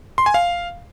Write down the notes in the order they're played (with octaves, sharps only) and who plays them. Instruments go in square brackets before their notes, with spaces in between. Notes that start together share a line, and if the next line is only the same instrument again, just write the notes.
[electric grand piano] C6
G#5
F5